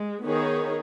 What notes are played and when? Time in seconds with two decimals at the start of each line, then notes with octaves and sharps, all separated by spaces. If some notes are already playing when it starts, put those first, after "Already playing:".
Already playing: G#3
0.25 D#3 B3 D#4 G#4 C#5